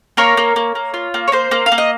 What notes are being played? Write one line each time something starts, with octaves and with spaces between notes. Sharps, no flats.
A#3 A#4 C#5
A#3
A#3
A#3
F4
A#3
C#5
A#3 C5
A#3
F5
A#3
D#5